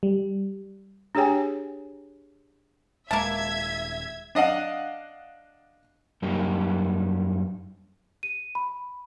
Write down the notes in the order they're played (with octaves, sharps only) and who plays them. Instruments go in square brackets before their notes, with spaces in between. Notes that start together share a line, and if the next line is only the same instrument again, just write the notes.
[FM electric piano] G3
[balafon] D4 G4 G#4 C#5 G5 G#5
[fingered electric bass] D#1 G#3 [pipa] A#3 A5 [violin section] E5 G#6
[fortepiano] D4 D#5 F5 F#5
[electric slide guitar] F#2 G3 A#3 D#4 G4
[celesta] D#7
B5